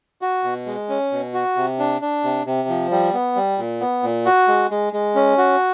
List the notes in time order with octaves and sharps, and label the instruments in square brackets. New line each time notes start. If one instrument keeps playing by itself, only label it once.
[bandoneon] F#4
B2
G#3
C#4
B2
F#4
C3
D4
D4
C3
C3
F3
G3
B3
G3
A#2
B3
A#2
F#4
G#3
G#3
G#3
C#4
F#4